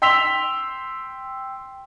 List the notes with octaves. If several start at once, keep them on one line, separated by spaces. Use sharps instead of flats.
G5 C6 E6 B6 F7 G7